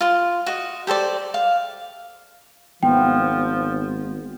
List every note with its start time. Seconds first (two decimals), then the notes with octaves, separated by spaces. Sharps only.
0.01 F4 C6
0.47 F#4 D#5
0.87 G4 A4 C5 D5
1.34 F5
2.83 G#1 F3 A#3 B3 E4 G5